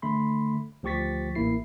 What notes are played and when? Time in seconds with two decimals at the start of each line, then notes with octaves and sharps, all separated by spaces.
0.02 D3 A3 B5 C6
0.83 D2 F3 G4 C#6 A6 B6
1.35 A1 A#3 E4 C7